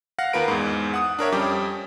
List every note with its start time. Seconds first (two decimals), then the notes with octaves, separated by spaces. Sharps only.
0.18 F5 F#5 F6 A#6
0.33 D#2 F4 A#4 B4 D7
0.48 E2 G#2
0.94 F#5 D#6
1.19 D4 A#4 C#5 E5
1.32 F2 G3 C#4 G5 D6